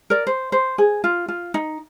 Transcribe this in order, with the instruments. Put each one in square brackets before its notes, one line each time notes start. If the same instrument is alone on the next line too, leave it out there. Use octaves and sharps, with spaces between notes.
[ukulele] A#4 D5
C5
C5
G#4
F4
F4
D#4